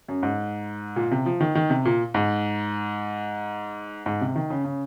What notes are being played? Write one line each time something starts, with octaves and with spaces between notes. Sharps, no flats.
F#2
G#2
A#2
C3
F3
D#3
D#3
C3
A#2
G#2
G#2
C3
D#3
C#3
C#3